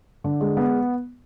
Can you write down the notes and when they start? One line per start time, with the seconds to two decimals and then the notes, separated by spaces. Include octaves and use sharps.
0.24 D3
0.41 G#3
0.57 B3